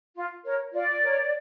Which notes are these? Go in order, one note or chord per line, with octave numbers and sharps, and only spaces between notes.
F4
A#4 C#5
F4 D5
A#4 C#5